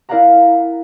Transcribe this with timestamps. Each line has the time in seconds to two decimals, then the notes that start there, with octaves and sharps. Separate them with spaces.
0.09 E4 A#4 D5 F5 F#5 A#5